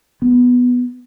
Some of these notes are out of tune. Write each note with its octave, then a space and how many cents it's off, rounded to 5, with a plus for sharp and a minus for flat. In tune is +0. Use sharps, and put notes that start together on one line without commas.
B3 +0